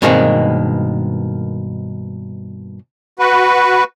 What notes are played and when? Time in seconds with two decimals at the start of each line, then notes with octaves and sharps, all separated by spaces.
0.02 G2 B2 D#3 G#3 A#3 C4
3.19 F#4 B4